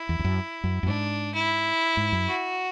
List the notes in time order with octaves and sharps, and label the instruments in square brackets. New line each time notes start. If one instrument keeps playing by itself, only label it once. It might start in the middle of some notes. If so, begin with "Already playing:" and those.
Already playing: [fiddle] E4
[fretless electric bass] E2
E2
F#2
F#2
F#2
[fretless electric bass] G#2 [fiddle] D4
[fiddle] E4
[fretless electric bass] G#2
F#2
[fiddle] F#4